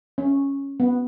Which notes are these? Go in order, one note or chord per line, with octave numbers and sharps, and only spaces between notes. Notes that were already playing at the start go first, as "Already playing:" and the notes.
C#4
B3